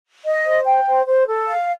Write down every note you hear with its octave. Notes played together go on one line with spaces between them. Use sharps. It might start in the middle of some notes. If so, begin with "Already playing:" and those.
D#5
C5
G5
C5
C5
A4
F5